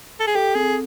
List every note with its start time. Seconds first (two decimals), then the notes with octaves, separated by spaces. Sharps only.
0.20 A4
0.27 G#4
0.35 G4 A4
0.55 C4 G#4